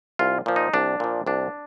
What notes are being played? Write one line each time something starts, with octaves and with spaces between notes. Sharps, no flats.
C2 F4
A#2 F3
D#4
C2 D4
A#2 F3
C2 D4